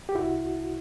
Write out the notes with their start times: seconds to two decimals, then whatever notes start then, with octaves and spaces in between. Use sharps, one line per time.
0.09 G4
0.15 C2 E4 F#4